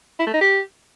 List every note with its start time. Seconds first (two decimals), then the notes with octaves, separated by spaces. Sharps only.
0.19 E4
0.27 A3
0.34 D#4
0.41 G4